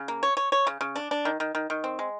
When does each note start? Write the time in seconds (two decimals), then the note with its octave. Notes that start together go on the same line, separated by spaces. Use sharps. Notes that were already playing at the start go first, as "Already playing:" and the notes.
Already playing: C#3
0.08 A#3
0.23 C#5
0.37 C#5
0.52 C#5
0.67 C#3
0.81 C#3
0.96 D4
1.11 D4
1.25 D#3
1.40 D#3
1.55 D#3
1.70 D#3
1.84 C4
1.99 G#3